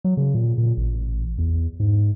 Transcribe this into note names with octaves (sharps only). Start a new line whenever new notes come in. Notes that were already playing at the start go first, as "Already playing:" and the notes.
F#3
C#3
A#2
A#2
A1
E2
G#2